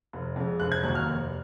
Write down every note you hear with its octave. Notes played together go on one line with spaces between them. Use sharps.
F1
F2 C#3 G#3
F1 F#6
G#6
D#2 D#3 F#3 A#3 F#6
F6
F1